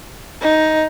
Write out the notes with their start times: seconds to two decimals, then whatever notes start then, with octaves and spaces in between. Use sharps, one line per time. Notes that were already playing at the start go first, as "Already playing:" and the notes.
0.41 D#4